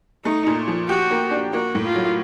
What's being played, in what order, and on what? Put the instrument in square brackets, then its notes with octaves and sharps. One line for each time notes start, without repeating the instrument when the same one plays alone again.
[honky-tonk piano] A3 [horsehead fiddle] D#4
[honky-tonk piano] A#2
F3
[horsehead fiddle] F#4 [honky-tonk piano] G4
[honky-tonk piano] A#3
D4
[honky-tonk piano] A#3 [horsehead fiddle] F#4
[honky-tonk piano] A2
[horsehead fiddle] F4
[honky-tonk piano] F#3